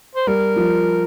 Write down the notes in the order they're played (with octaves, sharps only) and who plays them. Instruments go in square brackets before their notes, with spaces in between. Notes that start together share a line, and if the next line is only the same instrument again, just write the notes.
[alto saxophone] C5
[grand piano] G3 [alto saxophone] A#4
[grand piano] F3